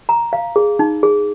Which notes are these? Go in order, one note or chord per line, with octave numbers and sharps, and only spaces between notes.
A#5
F5
G#4
D#4
G#4